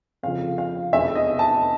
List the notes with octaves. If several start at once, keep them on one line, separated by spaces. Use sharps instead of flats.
F2 C#3 F3 F5
F5
F1 E2 B2 E5
D#5
A5